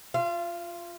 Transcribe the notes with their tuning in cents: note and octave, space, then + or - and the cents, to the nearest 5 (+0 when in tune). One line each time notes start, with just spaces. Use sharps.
F4 +0 F5 -35